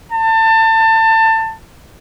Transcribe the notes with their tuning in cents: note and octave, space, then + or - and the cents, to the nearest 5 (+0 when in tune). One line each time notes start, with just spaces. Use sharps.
A5 +25